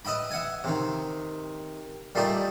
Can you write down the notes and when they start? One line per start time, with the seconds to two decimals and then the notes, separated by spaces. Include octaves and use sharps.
0.05 B4 D#5 E5 G5 B5
0.31 E5 F#5 G#5
0.64 C3 D#3
2.15 A#2 G3 A3 D#4 E4 G4